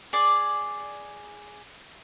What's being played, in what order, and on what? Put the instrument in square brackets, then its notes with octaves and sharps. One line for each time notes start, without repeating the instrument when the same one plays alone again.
[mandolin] G#4 D5